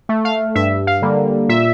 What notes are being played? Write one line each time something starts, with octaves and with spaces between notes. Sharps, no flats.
A3
F5
G2 E5
F5
D3 G3 A#3
A#2 E5